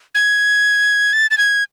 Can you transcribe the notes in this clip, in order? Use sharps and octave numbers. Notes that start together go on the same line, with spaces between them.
G#6
A6
A6
G#6